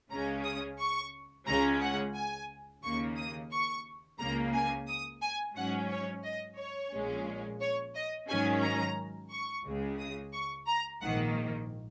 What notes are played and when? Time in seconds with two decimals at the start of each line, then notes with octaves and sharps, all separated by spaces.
0.11 C#2 C#3 G#3 C#4 A#5
0.45 D#6
0.79 C#6
1.47 C#2 C#3 G#3 C#4 A#5
1.82 F#5
2.16 G#5
2.84 D#2 C#3 A#3 C#6
3.17 D#6
3.52 C#6
4.19 C#2 C#3 A#3 A#5
4.54 G#5
4.88 D#6
5.22 G#5
5.56 G#2 F#3 C#4 F#5
5.91 C#5
6.24 D#5
6.58 C#5
6.93 A#1 A#2 G#3 C#4
7.61 C#5
7.95 D#5
8.29 G#2 D#3 F#3 C#4 G#5
8.63 A#5
9.31 C#6
9.65 C#2 C#3 G#3
9.99 D#6
10.33 C#6
10.67 A#5
11.01 A#1 G#2 D#3 A#3 F#5